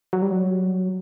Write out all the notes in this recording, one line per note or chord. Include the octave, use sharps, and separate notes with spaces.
F#3
G3
F#3